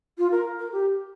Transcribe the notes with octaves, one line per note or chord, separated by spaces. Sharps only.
F4
A#4
A#4
G4